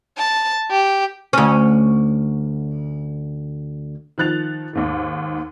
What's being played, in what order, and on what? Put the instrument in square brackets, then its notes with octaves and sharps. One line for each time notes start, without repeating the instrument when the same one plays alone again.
[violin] A5
G4
[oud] D2 C#4
[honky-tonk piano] D#3 F3 F#6 A6 F7
D#2 G#2 D#3